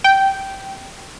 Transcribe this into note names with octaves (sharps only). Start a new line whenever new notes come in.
G5